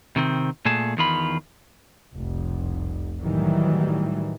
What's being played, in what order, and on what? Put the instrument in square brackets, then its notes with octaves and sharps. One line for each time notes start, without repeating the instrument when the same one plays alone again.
[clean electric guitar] C3 D#3 C4
A#2 A3 G#4 A5
E2 D#3 F4 B5
[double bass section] F1 C2
A2 D#3 E3 F#3 G3